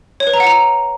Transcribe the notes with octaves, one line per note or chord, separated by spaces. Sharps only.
C#5
B4
A#5
F#5
A#5